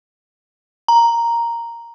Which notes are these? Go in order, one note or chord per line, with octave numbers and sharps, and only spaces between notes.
A#5